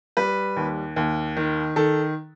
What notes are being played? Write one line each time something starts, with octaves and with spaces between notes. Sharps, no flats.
G3 B4
D#2
D#2
D#3
D#3 A4